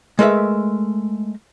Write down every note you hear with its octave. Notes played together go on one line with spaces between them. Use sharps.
G#3 A3 A#4 B4 E5